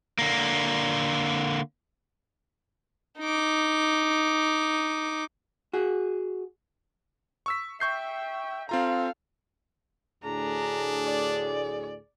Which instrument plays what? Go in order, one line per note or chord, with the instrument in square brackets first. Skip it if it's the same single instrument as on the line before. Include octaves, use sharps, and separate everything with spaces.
[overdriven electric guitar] D3 A#3
[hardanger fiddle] D#4 D6
[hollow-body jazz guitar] F#4 G#4
[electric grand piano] C#6 E6 B6
[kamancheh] E5 G5 [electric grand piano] C#6 G6 C7
[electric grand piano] C4 F4 A#5 [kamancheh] A4 F5
[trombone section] D2 A2 G#4 [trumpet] D4 [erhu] A#5
[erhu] D5